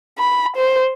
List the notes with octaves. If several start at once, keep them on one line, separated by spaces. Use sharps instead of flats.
B5
C5